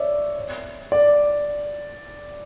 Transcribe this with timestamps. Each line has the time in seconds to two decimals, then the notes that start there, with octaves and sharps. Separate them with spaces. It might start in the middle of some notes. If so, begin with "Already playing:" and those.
Already playing: C#5 D5 E5
0.92 D5